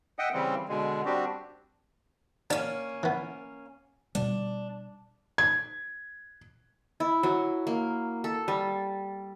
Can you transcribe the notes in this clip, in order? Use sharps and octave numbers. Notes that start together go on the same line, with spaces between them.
D#5 E5 F#5 G5 D#6
C#3 E3 G3 C4
B2 D3 G#3
G3 C4 D4 F#4 G4
A#3 C#4 D4
E3 B3
B2 G3 D4
G#6
E4
F#3
A#3
A4
G3